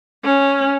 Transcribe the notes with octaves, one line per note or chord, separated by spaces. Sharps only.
C#4